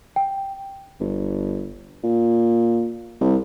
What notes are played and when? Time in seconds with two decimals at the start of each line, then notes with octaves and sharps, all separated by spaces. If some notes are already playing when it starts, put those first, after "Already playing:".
0.16 G5
1.00 G1
2.03 A#2
3.21 C2